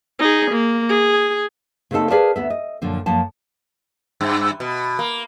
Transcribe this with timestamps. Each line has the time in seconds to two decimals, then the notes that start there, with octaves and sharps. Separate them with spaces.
0.19 D#4 G#4
0.51 A#3
0.89 G#4
1.91 C#3 A3 A#3 C4 D#4 A4
2.10 G#4 A#4 B4 D5 F5 A5
2.36 D2 B3 E5
2.50 D#5
2.82 F#2 A#2 D3 F3
3.06 F#2 F3 A#3 A5
4.21 G2
4.60 B2
4.99 A#3